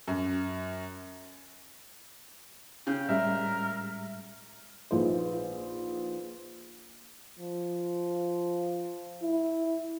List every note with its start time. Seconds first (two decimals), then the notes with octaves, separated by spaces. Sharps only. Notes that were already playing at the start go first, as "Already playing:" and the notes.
0.08 F#2
2.87 C#3 G5
3.09 A2 G3 G#3 A#4 E5
4.91 A#1 D#4 F4 G#4 B4 C5
7.39 F3
9.22 E4